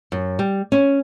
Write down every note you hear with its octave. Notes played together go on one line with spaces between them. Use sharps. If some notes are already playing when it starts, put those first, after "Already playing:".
F#2
G3
C#4